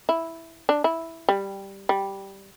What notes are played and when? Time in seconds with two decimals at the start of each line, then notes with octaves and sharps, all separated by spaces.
0.09 E4
0.69 D4
0.84 E4
1.29 G3
1.89 G3